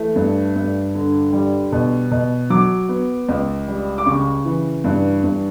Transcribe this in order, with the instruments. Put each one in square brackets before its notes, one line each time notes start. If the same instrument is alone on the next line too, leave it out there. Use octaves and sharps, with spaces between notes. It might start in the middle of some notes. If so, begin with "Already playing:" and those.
Already playing: [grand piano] E3 A3
G2
G2
D3
G3
B2
B2
F#3 D6
B3
C#2
G3
D6
C#3 C#6
E3
G2
G2